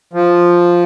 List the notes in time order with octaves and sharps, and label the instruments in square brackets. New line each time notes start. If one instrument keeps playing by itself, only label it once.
[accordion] F3